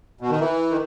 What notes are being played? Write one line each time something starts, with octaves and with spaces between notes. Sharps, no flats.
B2
D#3
E3
D#3